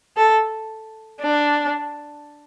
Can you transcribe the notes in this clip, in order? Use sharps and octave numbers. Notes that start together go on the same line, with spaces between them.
A4
D4